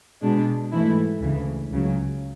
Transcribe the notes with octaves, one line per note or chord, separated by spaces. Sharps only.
B2 G#3 D4
G#2 E3 A3 E4
D2 C#3 E3
C#2 C#3 F#3